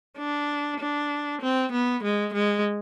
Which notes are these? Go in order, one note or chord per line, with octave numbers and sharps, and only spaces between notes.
D4
D4
C4
B3
G#3
G#3